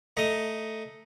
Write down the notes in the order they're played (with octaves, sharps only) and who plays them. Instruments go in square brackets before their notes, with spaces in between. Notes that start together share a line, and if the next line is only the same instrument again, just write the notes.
[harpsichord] A3 D#5 A#5